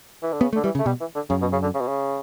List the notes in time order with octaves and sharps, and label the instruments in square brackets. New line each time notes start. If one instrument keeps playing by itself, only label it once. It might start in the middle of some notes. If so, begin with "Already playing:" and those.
[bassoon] E3
D3
[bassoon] C#3 [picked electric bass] B3
[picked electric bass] A3
[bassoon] D3
[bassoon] E3 [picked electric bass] G3
[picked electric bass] C#3
[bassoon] A3
[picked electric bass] B2 [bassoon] G3
[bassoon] E3
D3
[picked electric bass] F#2 [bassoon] C#3
[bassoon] B2
C#3
D3
C#3
B2
C#3